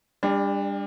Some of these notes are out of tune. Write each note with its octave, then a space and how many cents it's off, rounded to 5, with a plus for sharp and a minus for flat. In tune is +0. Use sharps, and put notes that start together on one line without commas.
G3 +35 D4 +0